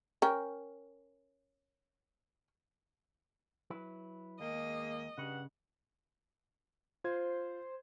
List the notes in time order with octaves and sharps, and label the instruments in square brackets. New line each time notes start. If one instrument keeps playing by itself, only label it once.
[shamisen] C#4 A#4 G5
[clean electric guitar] F#3 E4 B4
[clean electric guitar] D#2 [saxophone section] G#3 A#3 [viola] D#5
[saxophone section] G2 F#5 [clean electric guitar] C#3
[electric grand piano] F4 G#6 [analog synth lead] C5